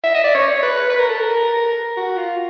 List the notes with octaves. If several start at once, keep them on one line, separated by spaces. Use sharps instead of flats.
E5
D#5
D5
C#5
B4
B4
A#4
A4
A#4
F#4
F4